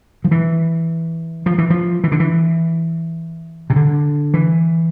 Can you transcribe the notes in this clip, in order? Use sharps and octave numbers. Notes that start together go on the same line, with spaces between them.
F3
E3
F3
E3
F3
E3
D3
E3
C3
D3
E3